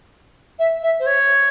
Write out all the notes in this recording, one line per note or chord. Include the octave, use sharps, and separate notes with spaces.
E5
E5
C5
C#5